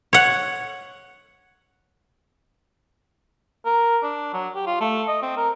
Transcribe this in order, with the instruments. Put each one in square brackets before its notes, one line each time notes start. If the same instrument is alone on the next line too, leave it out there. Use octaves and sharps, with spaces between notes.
[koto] C#5 F#5
[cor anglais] A#4
D4
F#3
G4
F4
A3
D#5
C4
A#4